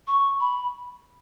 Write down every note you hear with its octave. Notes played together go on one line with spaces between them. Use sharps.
C#6
B5